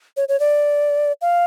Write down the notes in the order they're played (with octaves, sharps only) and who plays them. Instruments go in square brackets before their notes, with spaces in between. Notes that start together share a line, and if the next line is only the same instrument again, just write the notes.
[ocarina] C#5
C#5
D5
F5